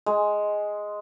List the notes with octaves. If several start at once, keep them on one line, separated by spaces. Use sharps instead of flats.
G#3